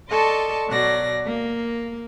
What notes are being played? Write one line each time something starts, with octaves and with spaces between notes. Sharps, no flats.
A4 D5 D#5 A5 C6 C#6
B2 F#3 D5 A#6
A#3